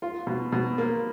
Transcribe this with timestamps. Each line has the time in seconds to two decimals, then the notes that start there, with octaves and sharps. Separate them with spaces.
0.02 F4
0.27 B2
0.52 B2
0.78 A#3